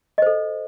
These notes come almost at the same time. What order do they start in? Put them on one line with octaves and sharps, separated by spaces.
D#5 C5 A4